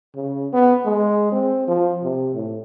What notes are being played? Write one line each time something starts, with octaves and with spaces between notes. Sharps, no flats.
C#3
B3
G#3
C4
F3
C3
A2